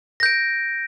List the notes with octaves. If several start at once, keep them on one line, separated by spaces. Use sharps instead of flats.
G6 A#6 D7